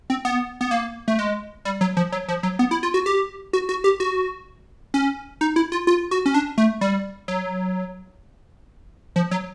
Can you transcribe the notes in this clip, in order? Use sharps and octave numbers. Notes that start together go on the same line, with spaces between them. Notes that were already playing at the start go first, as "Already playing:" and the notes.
C4
B3
B3
A#3
A3
G#3
G3
F#3
F3
F#3
F3
F#3
B3
E4
F4
F#4
G4
F#4
F#4
G4
F#4
C#4
D#4
E4
F4
F4
F#4
C#4
D4
A3
G3
F#3
F3
F#3